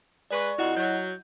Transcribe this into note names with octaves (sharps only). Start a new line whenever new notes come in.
G#3 B4 D5 C#6
F2 E4 F#4 D#5 F#5
F#3 G6